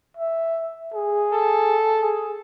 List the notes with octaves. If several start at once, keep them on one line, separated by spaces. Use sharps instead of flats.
E5
G#4
A4
G#4